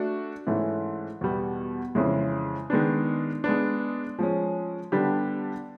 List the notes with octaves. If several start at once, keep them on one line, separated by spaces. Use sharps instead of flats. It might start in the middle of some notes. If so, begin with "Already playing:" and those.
Already playing: A3 D4 F#4
G#2 E3 A3 C#4
E2 B2 G3 B3
F2 C#3 E3 G#3
D#3 G#3 B3 D4
G#3 B3 D4
F3 G#3 C#4
D3 G3 B3 D4 G4